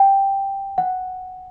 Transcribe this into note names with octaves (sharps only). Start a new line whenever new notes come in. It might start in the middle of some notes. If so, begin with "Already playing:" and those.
Already playing: G5
F#5